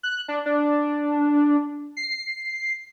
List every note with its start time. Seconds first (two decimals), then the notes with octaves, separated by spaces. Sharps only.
0.03 F#6
0.28 D4
0.46 D4
1.97 C7